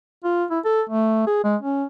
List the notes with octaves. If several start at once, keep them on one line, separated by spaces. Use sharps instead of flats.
F4
E4
A4
A3
G#4
G#3
C#4